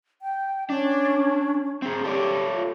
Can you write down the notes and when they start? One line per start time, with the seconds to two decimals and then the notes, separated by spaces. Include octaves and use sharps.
0.22 G5
0.70 C#4 D4
1.82 C4 G#4
2.04 G4 A4 C#5 D5
2.54 F4